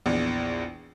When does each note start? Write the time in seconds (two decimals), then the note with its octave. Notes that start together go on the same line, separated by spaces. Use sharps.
0.06 A#1 E2